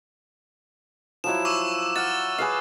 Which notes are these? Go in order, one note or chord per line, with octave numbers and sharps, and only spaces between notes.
F3 F#3 E4 E7
C#6 D6 E6
F#5 F6 A6
G#4 B4 F5